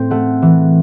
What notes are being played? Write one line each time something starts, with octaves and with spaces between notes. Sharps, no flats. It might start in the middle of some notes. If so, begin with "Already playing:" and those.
Already playing: A2 C4
A3 F#5
E3